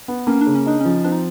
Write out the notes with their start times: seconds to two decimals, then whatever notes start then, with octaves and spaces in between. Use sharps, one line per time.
0.08 B3
0.27 A#3 C#4
0.41 D4
0.46 C#3
0.55 C#4
0.66 D4 D#4
0.81 F3 C#4
1.05 C4 D4
1.12 D#4